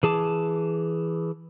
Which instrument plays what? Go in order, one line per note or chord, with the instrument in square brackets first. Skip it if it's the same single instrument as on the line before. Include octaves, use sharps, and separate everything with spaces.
[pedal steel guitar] E3 G#4 A5 D6